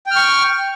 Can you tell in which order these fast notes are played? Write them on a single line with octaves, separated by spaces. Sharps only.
G5 F6 C#6